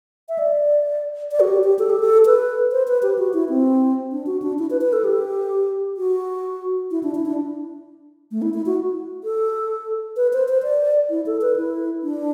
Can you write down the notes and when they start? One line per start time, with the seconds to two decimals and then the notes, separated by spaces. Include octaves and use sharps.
0.29 E5
0.38 D5
1.32 D5
1.40 F#4
1.48 G4
1.64 G4
1.79 A4
1.90 G4
2.00 A4
2.26 B4
2.72 C5
2.88 B4
3.03 G4
3.18 F#4
3.33 E4
3.49 C4
4.12 D4
4.26 F#4
4.42 D4
4.59 E4
4.70 B4
4.81 B4
4.93 A4
5.04 G4
5.97 F#4
6.91 E4
7.03 D4
7.15 E4
7.26 D4
8.31 A3
8.42 E4
8.54 E4
8.66 F#4
9.24 A4
10.16 B4
10.33 C5
10.48 C5
10.63 D5
11.10 E4
11.26 A4
11.41 B4
11.56 E4
12.03 D4